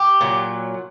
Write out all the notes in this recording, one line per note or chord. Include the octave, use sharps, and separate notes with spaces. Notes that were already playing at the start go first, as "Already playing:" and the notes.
Already playing: G4
A#2 F#3